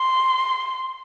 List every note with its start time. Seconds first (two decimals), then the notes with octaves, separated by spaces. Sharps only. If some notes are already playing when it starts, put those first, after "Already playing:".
Already playing: C6